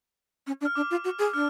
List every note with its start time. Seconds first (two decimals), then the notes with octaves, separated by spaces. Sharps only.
0.47 C#4
0.61 D4
0.65 F6
0.75 D4 D6
0.91 F4
1.04 F#4
1.19 G#4
1.33 D4 F6